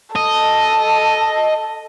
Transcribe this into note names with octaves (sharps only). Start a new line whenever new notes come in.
A4 D#5